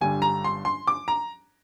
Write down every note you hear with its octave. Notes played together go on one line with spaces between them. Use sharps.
G1 G2 D3 G3 G#5
A#5
C6
C6
D6
A#5